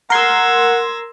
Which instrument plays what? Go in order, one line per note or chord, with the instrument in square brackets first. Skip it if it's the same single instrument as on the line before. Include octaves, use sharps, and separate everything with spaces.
[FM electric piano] A#4 C6 [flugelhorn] F#5 [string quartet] E6 G#6 A#6